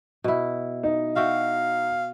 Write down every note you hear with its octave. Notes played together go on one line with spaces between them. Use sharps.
B2 E4
D#4
F#4 E5 F5 G5